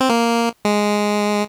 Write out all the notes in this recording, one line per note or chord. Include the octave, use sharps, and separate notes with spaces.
C4
A#3
G#3